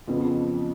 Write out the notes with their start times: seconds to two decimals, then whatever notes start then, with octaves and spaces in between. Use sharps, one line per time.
0.07 F2 C#3 F3 B3